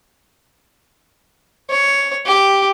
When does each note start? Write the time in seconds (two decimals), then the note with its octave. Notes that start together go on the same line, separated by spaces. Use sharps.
1.70 C#5
2.26 G4